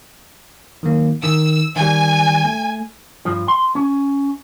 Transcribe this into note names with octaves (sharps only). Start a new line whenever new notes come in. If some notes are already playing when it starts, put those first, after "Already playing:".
D#3 F#3 A#3
D#3 E6
D#3 G3 G#5
A3
G2 F3
C6
C#4